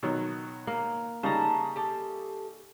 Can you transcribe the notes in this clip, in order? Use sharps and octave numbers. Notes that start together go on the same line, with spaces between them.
B2 D#3 F#3
A#3
C#3 G3 D#4 A5 A#5
G4 A4